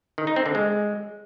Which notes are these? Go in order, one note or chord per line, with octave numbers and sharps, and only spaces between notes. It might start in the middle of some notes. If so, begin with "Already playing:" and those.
D#3
D#4
C4
D3
G#3